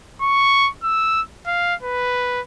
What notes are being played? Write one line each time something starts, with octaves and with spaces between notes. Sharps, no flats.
C#6
E6
F5
B4